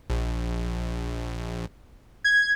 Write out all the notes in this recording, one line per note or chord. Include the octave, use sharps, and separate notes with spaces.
A#1
G#6